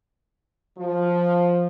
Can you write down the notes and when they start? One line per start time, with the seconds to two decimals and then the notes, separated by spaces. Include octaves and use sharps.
0.78 F3